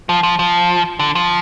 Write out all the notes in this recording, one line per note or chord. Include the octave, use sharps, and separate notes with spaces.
F3
F3
F3
D3
F3